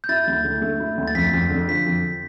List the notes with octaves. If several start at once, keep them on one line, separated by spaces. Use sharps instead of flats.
G6
E4 A6
D2
D3
A3
E4
D2
A6
F2 B6
F2
D3
F3 B6
F2